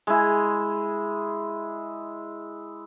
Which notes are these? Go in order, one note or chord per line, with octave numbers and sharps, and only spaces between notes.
G#3 E4